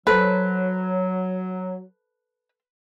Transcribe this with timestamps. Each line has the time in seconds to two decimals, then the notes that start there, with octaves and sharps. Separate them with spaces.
0.07 F#3 A4 B4 C5